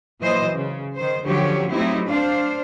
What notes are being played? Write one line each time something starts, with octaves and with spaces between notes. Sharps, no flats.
A#2 E3 F#3 C5 D#5
C#3
D#3 C5
D3 F3 F#3 C#4 G4 C#5
F#3 A3 C4 D#4 E4 G4
D4 C5 F5